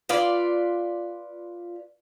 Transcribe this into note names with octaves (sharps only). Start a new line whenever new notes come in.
F4 B4 D5